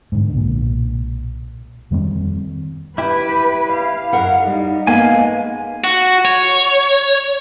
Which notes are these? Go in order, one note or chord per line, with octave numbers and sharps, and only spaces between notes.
G#2 D3
B1 A#2
F2 D#3 G3 C4
E4 G4 B4
F5
F#2 A#4 F#5
G3 D#4
G#3 A#3 B3 F5 G#5
F#4
C#5